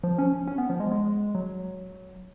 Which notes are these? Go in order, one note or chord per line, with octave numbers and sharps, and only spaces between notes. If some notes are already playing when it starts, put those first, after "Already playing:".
F3
C#4
C#4
B3
F3
G#3
G#3
F#3